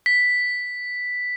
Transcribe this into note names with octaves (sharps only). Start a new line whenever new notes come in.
B6